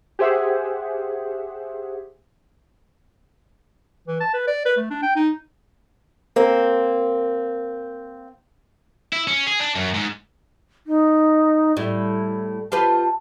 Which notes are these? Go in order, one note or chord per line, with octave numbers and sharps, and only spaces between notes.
G4 G#4 C5 E5 F#5
E3
A5
B4
D5
B4
A3
D4
G5
D#4
A#3 C4
E4
C#4
G#4
D4
F#2
G#2
D#4
A2 G3 E4
F4 G4 B4 A5